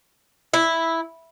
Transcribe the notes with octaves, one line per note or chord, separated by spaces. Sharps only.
E4